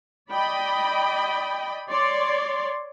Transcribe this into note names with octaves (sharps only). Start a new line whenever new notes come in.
D5 D#5 G5 B5
C#5 D5 C6